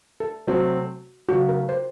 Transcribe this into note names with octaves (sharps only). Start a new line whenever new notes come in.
A4
C3 F#3 A3 C4 F#4
C#3 F#3 A3 F#4
A#4
C5